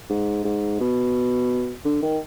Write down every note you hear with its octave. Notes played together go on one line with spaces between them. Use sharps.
G#2
G#2
B2
D3
D#3